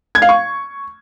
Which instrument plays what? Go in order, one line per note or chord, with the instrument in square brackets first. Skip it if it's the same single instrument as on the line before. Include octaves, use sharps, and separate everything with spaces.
[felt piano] G#6
F5
C#6